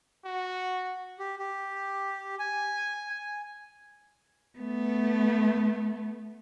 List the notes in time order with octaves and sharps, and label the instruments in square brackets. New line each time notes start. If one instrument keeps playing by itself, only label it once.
[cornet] F#4
[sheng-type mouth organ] G4
G4
G#5
G#5
[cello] A3 B3